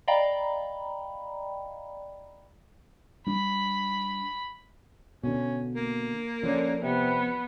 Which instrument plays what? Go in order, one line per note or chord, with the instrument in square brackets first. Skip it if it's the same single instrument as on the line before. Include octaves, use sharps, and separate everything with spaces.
[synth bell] D5 D#5 F5 G5 A#5 B5
[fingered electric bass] G3 D4 [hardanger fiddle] B5
[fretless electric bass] B2 D3 [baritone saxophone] C#4
[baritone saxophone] A#3
[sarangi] D3 [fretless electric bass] F3 [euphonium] C#4
[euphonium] C3 [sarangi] B3